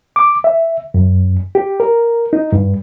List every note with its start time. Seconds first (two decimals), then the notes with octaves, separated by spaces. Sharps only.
0.16 D6
0.44 E5
0.94 F#2
1.55 G4
1.80 A#4
2.33 D#4
2.52 G2